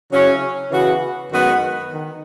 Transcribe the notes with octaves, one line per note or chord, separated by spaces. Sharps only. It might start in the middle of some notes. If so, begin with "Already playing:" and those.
C#3 F#3 C#4 E4
C#3 E3 B3 F#4
F#2 D#3 G#3 B3 F#4
D#3